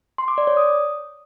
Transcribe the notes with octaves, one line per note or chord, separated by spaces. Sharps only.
C6
D6
D5
C#5
D#6